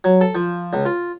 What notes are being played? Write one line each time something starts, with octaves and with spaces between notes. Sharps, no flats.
F#3
A4
F3
C#2
F4